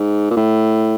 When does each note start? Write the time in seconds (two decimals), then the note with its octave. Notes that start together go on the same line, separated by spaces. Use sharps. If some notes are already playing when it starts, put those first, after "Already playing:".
Already playing: G#2
0.30 A#2
0.37 A2